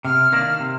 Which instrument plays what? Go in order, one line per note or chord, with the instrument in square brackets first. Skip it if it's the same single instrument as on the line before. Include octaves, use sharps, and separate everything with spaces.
[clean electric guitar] C3 [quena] F6
[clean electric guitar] D#3 A#3 D4
C3